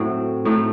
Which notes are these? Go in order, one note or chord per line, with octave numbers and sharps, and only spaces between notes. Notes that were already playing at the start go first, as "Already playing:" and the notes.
Already playing: A2 F#3 C4
A2 A3 D#4